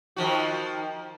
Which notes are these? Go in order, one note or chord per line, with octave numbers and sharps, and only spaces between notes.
D#3 F3 F#4